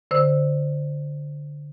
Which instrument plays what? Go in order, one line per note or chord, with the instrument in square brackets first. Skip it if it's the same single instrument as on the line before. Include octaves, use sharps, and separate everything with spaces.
[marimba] D3 C5 E6